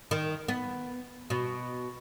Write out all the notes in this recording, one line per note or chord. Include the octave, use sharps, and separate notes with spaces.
D#3
B3
B2